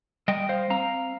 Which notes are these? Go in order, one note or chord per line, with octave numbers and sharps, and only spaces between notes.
G3 D#5 G5
C5 F5
C4 F5 A#5